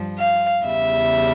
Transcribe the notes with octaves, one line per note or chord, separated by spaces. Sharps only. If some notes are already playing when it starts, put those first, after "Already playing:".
Already playing: G2 F3
F5
E2 C#3 G3 E5